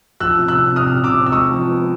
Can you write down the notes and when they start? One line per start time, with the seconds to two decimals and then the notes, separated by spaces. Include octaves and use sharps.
0.20 F3 E6 F#6
0.39 C3
0.48 E6 F#6
0.58 C3
0.76 C3 D#6 F6
0.95 C3
1.04 D6 E6
1.14 C3
1.26 E6
1.32 G#3 C#6 D#6
1.51 F3
1.69 B3